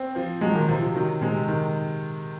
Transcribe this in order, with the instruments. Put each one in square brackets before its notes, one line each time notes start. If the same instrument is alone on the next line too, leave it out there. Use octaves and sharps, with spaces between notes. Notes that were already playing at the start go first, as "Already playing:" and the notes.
Already playing: [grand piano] C4
[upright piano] F3 [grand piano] C4
[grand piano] F#3 [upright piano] G#3
[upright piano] D#3
[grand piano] C3 [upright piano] F3
[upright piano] F3
[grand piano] D#3 [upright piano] F#3
[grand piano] C3 [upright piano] G#3
[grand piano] D#3